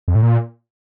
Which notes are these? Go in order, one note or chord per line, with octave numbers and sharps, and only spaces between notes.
F2
A2
A#2